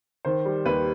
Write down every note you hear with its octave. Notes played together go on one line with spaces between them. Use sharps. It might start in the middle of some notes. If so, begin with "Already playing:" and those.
D#3 C5
G3
D#2 B4